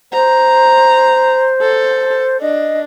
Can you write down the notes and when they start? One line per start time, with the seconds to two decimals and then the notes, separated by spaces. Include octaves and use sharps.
0.13 C5 A#5
1.61 A4
2.41 D4 D#5